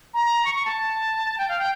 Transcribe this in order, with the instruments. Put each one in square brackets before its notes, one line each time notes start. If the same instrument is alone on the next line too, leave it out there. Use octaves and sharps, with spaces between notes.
[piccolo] A#5
C#6
C#6
A5
G5
F5
G5